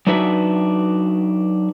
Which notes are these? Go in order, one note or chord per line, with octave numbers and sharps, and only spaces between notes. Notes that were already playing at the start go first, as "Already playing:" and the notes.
F#3 D4 D#4 F#4 B4 E5